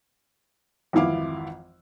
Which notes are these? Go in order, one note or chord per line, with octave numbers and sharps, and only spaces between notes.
G#1 F2 E3 E4 F5 D6